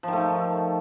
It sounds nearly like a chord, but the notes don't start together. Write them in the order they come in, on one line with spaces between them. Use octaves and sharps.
F3 D#3 A3 A4